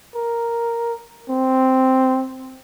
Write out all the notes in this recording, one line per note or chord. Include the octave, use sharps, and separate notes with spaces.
A#4
C4